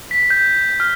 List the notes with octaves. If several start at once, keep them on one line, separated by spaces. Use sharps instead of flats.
B6
G6
F6